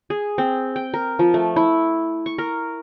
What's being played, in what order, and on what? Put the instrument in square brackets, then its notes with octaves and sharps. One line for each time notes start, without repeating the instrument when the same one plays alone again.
[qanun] G#4
C4
G5
A#4
F3
A3
E4
C#6
A#4